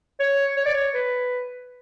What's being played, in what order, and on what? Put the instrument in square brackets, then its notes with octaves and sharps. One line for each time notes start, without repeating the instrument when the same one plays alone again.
[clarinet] C#5
C#5
D5
C#5
B4